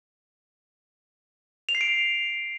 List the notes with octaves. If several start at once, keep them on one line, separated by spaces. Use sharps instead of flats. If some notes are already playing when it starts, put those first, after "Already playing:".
F7
C7
D7